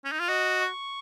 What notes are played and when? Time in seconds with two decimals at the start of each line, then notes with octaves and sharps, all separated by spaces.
0.04 C#4
0.12 D#4
0.20 F4
0.28 F#4 D#5
0.60 C#6